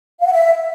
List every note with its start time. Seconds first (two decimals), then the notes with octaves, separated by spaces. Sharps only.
0.20 F5
0.26 F#5
0.32 E5